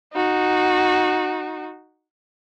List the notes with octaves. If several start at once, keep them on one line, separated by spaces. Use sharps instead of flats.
D#4 F#4